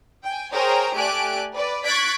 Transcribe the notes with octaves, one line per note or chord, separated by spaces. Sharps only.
G5 G#5
G#4 A#4 C5 C#5 G5 A#5
A3 G4 D5 G#5 F#6 D7
B4 D5
C#6 F#6 G#6 A6 B6 D7